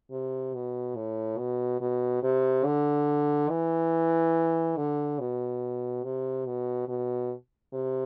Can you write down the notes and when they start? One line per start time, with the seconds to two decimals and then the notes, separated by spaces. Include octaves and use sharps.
0.11 C3
0.54 B2
0.96 A2
1.38 B2
1.81 B2
2.23 C3
2.65 D3
3.50 E3
4.77 D3
5.19 B2
6.03 C3
6.46 B2
6.88 B2
7.73 C3